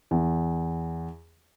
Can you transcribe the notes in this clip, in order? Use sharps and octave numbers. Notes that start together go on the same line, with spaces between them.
E2